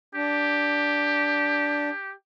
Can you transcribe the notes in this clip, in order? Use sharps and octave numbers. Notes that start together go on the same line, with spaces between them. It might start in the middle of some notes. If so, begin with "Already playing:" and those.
D4 G4